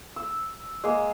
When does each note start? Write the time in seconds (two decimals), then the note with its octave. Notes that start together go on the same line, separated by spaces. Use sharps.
0.16 E6
0.84 G#3 A#3